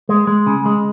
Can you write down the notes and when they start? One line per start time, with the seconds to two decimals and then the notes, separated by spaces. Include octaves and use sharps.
0.09 G#3
0.27 G#3
0.47 C#3
0.66 G#3